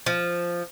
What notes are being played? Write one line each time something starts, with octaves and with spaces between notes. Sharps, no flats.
F3